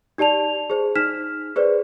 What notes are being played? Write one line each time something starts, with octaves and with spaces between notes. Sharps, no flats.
D#4 G4 D5 A5 F7
G#4 C5
D#4 F6 B6 E7
G#4 B4 C5 D5